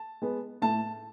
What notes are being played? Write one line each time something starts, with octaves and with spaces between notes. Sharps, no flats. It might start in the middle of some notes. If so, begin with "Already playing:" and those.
Already playing: A5
G#3 B3
A2 A5